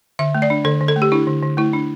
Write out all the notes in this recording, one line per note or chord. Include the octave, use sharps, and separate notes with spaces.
D3 E5
A3
D5
D4
D3 A4
D3
A4
A3
G4
D4 E4
D3
D3
A3 E4
D4